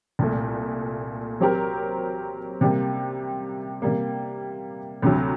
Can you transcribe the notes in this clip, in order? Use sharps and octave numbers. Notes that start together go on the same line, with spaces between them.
C2 A#2 A3
F#3 C4 G4 A#4
C3 G3 A#3
C3 G3 A#3
D2 C3 F#3